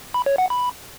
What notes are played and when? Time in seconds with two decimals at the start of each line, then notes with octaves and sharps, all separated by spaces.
0.14 B5
0.26 C#5
0.38 F#5
0.50 B5